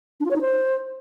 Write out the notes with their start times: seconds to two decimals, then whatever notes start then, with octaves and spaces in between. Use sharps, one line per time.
0.20 D4
0.25 F4
0.30 C#5
0.35 D#4
0.41 C5